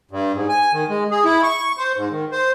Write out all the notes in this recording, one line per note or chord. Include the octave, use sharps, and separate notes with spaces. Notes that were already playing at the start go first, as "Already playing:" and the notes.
G2
G#2
G#5
D#3
G#3
G#4
E4
C#6
C5
G#2
D#3
C5